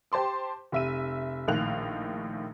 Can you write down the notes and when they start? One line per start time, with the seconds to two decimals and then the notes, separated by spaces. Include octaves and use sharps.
0.12 G4 C5 A5 C6 D6
0.72 F1 E5 D#7
1.48 A#1 A2 D#3 F5 F#6 F7